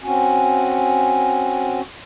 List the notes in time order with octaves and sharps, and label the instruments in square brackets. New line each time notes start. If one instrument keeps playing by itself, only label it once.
[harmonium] C4 C#4 F#4 G#5